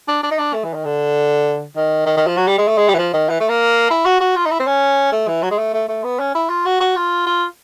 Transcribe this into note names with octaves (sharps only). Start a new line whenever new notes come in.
D4
D4
D#4
D4
A3
E3
D#3
D3
D#3
D#3
D#3
F3
F#3
G3
G#3
A3
G#3
G3
E3
F3
D#3
E3
A3
A#3
E4
F#4
F#4
F4
D#4
E4
C4
C#4
A3
E3
F#3
G#3
A3
A3
A3
B3
C#4
E4
F4
F#4
F#4
F4
F4